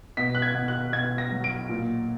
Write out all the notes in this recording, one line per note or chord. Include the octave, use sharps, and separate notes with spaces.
B2 B6
F#6
G#6
B2
F#6
B2 G#6
A#6
F#3
D7
A#2